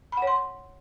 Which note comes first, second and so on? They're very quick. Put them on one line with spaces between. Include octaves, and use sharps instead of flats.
B5 F#5 C#5 C6